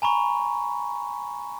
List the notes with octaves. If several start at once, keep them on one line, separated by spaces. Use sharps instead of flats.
G#5 A#5 B5 C#6